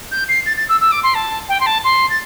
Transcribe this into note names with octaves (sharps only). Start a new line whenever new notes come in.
G6
C7
A6
A6
E6
E6
D6
C6
A5
G5
C6
A5
C6
A6